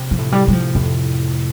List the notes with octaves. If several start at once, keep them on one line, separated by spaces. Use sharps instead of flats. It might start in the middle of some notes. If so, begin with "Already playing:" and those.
Already playing: C3
F3
A2
G3
C3 G3
F3
F2 A2